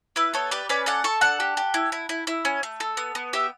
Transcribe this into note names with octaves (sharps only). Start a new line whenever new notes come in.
E4 B4
B3 A4 C#5
G4 B4 D5
C#4 B4 D5
A4 D5 F#5
A4 A5 C#6
D4 F#5 A5
G4
G4
E4
E4
E4
E4
C#4
A3
A4
B3
B3
G4 E5 G5